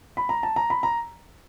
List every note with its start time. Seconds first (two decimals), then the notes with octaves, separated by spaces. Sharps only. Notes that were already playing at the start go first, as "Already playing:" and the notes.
0.17 B5
0.29 A#5
0.43 A5
0.56 A#5
0.70 B5
0.83 A#5